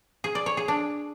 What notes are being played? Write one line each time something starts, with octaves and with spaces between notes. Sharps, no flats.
G#4
D5
C#5
G#4
D4